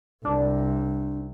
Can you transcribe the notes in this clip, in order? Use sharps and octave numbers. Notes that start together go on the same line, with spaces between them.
C2 D4